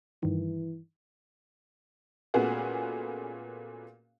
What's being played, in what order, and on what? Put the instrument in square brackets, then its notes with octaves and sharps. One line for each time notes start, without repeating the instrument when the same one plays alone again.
[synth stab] G2 D#3 [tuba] E3
[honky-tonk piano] A#2 A3 B3 C#4 F#4 G#4